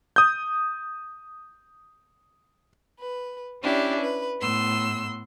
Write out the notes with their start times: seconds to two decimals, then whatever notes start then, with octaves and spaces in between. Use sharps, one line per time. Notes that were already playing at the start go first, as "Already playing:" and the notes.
0.16 D#6 G6
2.99 B4
3.62 C#4 D4 E4 G4
4.01 B4
4.41 A2 B3 C6 E6